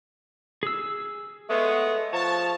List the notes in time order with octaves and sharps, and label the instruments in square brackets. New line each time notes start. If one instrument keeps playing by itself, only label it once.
[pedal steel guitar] G#4 E6
[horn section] G#3 B3 C#5 [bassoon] A3
[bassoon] F3 [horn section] C#5 A5